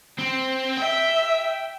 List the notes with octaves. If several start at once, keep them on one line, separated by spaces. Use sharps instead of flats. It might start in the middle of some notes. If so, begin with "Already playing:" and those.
C4
E5 G5